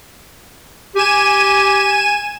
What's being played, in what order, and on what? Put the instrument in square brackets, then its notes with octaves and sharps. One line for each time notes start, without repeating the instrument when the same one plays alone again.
[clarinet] G4 [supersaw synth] G#5 D#7 E7